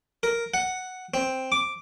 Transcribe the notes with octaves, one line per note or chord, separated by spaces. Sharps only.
A#4
F#5
C4
D6